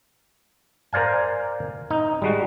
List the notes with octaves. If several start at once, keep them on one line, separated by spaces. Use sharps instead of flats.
A#4 C5 D5 F5 G#5
D#4
G3 G#3 F#4